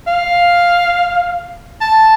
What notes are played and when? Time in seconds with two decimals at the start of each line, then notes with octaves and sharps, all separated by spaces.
0.07 F5
1.81 A5